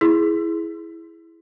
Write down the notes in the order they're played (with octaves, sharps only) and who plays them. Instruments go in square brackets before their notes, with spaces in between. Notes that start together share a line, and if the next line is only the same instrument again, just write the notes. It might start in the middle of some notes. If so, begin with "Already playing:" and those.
[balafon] E4 G#4